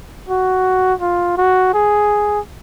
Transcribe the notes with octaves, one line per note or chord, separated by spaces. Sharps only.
F#4
F4
F#4
G#4